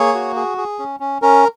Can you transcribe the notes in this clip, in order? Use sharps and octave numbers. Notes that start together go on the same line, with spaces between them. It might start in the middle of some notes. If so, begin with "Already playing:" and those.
Already playing: A#3 G#4 C#5
F#4
G#4
G#4
C#4
C#4
C#4 A#4